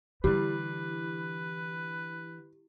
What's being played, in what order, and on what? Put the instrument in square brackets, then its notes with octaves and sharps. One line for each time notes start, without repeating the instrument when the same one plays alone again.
[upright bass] D3 E3 [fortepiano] G3 [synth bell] E4 G4 [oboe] B4